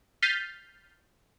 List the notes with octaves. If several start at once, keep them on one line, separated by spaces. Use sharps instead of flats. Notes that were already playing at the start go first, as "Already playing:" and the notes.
F6 G6 A6 B6 C7 D#7